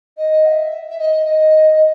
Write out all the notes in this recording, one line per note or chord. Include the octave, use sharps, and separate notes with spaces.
D#5
F#5
E5
E5
D#5
D#5